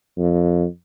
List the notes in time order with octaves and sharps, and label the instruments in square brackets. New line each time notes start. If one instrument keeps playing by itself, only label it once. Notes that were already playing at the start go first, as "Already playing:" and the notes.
[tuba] F2